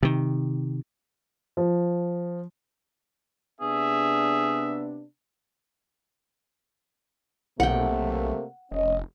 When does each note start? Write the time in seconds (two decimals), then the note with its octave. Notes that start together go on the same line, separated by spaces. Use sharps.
0.03 C3 D#3
1.57 F3
3.61 C3 B3 D4 G#4 E5
7.60 B1 C3 A3 A#3 F#5 G5
8.72 F1 C#4 D#5